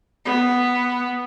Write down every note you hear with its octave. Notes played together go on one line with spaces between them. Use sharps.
B3